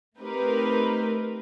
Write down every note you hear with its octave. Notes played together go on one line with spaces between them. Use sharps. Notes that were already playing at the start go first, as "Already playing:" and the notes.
A3 C4 D#4 G4 A#4 B4